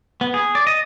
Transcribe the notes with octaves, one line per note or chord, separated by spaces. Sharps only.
B3
G#4
D5
D#5